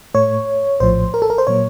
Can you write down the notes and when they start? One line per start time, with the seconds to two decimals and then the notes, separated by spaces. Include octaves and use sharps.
0.14 A2 A3 C#5
0.80 A#1 A2 F3 C5
1.14 A#4
1.22 A4
1.30 A#4
1.38 C5
1.47 A#2 F#3 A#3 C#5